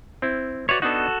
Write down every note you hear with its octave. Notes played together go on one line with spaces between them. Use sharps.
C4 E4
F#4 B4 C#5 D5 E5
B3 D4 D#4 F#4 A4